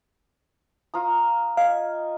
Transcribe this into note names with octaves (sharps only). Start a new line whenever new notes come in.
F4 A#5 D#6
D#5 F5 G#5